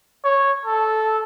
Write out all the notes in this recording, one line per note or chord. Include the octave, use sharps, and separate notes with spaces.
C#5
A4